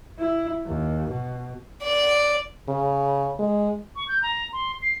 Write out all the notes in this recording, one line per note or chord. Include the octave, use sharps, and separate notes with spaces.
E4
D#2
B2
D5
C#3
G#3
C#6
G6
A#5
C6
C7